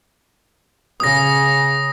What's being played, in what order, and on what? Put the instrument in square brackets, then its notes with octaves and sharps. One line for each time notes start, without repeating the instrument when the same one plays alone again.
[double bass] C#3 [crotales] D#6 A#6